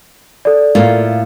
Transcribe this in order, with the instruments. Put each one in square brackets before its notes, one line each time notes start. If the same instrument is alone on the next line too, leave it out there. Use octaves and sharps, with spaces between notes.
[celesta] A4 D5
[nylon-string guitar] A2 A#3 F4